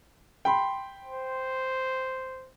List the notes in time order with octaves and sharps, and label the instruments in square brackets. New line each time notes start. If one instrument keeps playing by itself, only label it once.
[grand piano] G5 B5 C6
[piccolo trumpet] C5